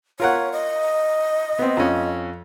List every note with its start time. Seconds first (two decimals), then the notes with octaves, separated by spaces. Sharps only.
0.20 F4 A#4 C#5 F#5
0.52 D#5
1.59 B3 C4
1.77 F2 C#4